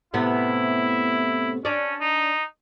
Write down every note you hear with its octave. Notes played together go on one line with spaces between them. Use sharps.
A2 C3 B3 E4
C#4 D4 D5
D#4